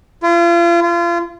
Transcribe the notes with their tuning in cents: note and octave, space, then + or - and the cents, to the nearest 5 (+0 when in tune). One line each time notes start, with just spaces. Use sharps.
F4 -35
F4 -30